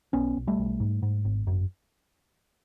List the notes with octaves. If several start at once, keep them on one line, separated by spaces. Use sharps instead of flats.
B1 B3 C#4
B1
G3 A3
B1
G#2
G#2
G#1
F#2